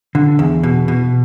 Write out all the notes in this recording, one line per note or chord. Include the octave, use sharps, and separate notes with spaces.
D3
E2
B2
B2